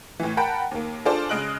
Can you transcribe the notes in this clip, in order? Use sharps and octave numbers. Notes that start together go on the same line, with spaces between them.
A2 E3
A#4 F#5 G5 A5 B5
D#2 A#3
D4 F4 G#4 A4 C5 D5
C#3 G#3 D#5 F#6 D7 F#7